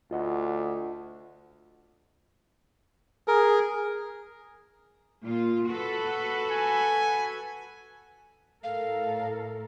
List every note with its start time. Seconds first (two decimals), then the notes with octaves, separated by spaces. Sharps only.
0.11 D2 F4 D#5 F#5
3.28 G#4 A#4
5.24 A#2 F4
5.68 F#4 A4 B4
6.51 G#5
8.63 A2 A4 A#4 F5